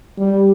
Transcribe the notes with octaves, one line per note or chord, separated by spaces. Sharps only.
G3